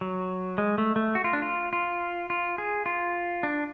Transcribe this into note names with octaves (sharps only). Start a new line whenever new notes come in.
F#3
G#3
A3
A3
F#4
F4
D4
F4
F4
F4
G#4
F4
D4